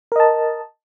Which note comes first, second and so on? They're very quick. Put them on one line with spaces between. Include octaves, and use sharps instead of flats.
A#4 D#5 A5